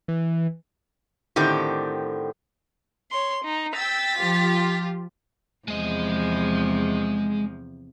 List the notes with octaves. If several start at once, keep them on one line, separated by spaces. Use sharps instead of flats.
E3
A2 D3 D#3 C4 G4
C#5 C6
D#4
G5 E6 A6 B6
F3 F4 G4
E2 C3 F3 G#3 D#5